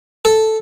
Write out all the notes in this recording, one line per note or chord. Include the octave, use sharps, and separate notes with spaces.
A4